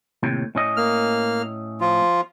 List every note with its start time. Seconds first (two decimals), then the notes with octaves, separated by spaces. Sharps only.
0.23 D#2 A2 C3
0.55 A2 C#4 D#5
0.77 A#3 F6
1.81 F3 F4